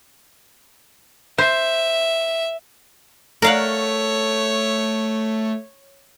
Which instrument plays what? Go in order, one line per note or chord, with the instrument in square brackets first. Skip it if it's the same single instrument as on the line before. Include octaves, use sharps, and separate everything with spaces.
[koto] C5 [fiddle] E5
[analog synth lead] A3 [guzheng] A#4 F5 F#5 [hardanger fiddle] C#5